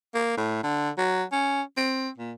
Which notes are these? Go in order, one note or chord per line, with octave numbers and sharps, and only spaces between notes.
A#3
A2
D3
F#3
C#4
C4
A#2